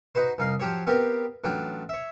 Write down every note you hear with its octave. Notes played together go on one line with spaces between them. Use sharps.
D#4 F#4 B4 C5
C2 D#4 F5 C6
F3 F#3 G4 C5 C#5
B3 C4 F4 G4 A#4
A1 F#3 D4 F4 G5
C#5 E5